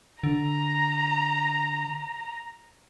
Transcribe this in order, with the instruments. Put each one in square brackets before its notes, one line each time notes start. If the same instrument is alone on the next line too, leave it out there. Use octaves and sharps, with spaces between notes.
[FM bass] D3 [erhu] A#5